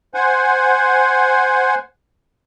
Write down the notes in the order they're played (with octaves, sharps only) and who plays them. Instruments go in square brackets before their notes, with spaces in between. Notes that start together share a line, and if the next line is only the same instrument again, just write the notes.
[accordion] C5 F#5 G#5